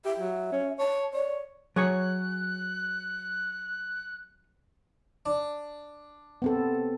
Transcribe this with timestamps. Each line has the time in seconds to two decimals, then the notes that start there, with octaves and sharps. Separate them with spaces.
0.05 G4 E5
0.19 F#3
0.52 C#4
0.79 C#5 A5
1.13 C#5 D5
1.76 F#3 G#4 C#5 F#6
5.26 D4
6.42 B3 C4 A4